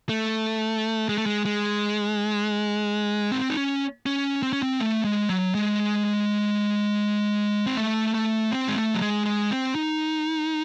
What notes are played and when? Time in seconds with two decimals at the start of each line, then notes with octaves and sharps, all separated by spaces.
0.09 A3
1.09 G#3
1.18 A3
1.26 G#3
1.45 G#3
3.32 C4
3.50 D#4
3.57 C#4
4.06 C#4
4.43 C4
4.53 C#4
4.63 C4
4.80 A3
5.05 G#3
5.30 F#3
5.55 G#3
7.66 C4
7.77 A3
8.14 A3
8.52 C4
8.68 G#3
8.76 A3
8.94 F#3
9.02 G#3
9.26 G#3
9.51 C4
9.75 D#4